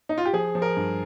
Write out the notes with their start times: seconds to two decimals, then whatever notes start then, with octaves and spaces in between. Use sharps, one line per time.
0.09 D#4
0.18 F4
0.25 G4
0.33 F3 G#4
0.55 F3
0.62 A#4
0.76 G2